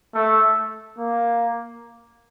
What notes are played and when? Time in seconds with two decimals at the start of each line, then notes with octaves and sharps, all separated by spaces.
0.14 A3
0.98 A#3